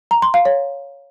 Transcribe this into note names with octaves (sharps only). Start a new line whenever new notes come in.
A#5
C6
F5
C#5